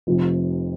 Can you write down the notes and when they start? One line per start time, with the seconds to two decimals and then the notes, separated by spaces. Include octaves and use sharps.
0.07 F1 F2 C3 F3